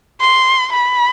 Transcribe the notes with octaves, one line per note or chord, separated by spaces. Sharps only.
C6
B5